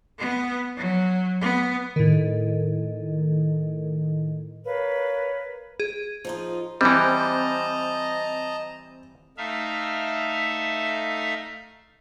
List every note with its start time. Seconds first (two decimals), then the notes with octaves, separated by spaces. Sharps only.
0.19 B3
0.77 F#3
1.41 B3
1.96 A2 D#3
4.65 A#4 B4 C#5 F5
5.80 G#4
6.25 F3 D#4 F4
6.81 E3 G3 C4 D#5 A5 A#5
9.38 A3 D#4 E5 F5